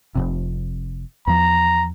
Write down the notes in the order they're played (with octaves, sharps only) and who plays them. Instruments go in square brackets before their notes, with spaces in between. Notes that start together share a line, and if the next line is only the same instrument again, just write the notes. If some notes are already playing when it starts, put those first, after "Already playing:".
[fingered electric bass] F1 F2 C3
[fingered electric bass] E2 F3 [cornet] A#5